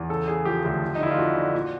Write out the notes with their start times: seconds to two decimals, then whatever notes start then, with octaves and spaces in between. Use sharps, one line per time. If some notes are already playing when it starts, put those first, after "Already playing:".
Already playing: E2
0.09 C#3 A4
0.27 C#3 G#4
0.45 F3 G4
0.63 D2 G4
0.82 F3
0.95 D#4
1.00 D3 E4
1.11 F4
1.18 F2 F#4
1.35 D3
1.54 A#2